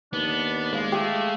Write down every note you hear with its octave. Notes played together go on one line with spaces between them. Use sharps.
D#2 B3 D4
G#3 F5
A3 G4